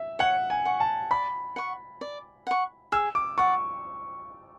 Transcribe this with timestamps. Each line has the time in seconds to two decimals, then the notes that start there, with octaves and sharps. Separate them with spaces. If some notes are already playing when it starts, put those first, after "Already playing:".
Already playing: E5
0.19 C#5 F#5
0.50 G#5
0.65 F#5 C#6
0.80 A5
1.11 D5 B5
1.56 F#5 C#6
2.01 D5
2.47 F#5 C#6
2.92 G#4 E6
3.15 D6
3.38 D5 F#5 C#6